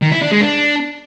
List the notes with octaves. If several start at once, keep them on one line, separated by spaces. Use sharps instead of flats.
D#3
E4
D4
G#3
D4